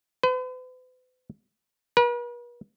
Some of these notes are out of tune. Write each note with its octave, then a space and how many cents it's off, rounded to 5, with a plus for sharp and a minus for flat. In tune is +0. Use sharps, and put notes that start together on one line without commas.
B4 +45
B4 -45